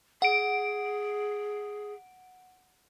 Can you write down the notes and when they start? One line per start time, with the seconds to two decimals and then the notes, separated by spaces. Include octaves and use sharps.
0.22 G#4 F#5 D7